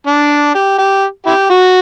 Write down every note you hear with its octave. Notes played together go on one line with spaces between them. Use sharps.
D4
G4
G4
E4 G4
F#4